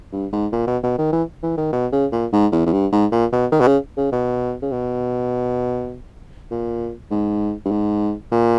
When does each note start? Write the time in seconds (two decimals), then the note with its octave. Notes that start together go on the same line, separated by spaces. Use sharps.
0.12 G2
0.33 G#2
0.52 A#2
0.67 B2
0.83 B2
0.98 D#3
1.13 E3
1.43 E3
1.58 D#3
1.73 B2
1.92 C#3
2.12 A#2
2.33 G#2
2.52 E2
2.67 E2
2.73 G2
2.92 G#2
3.12 A#2
3.32 B2
3.52 D#3
3.61 B2
3.67 C#3
3.97 C#3
4.12 B2
4.62 C#3
4.72 B2
6.51 A#2
7.11 G#2
7.65 G2
7.71 G#2
8.32 A#2